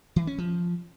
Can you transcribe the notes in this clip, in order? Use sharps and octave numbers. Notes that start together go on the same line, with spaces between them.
E3
C#4
F3